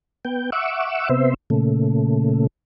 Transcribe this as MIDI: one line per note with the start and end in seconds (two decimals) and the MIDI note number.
0.25 0.50 59
0.25 0.50 79
0.52 1.09 76
0.52 1.09 78
0.52 1.09 85
0.52 1.09 86
0.52 1.09 88
1.09 1.34 48
1.09 1.34 59
1.09 1.34 72
1.09 1.34 76
1.50 2.47 46
1.50 2.47 49
1.50 2.47 57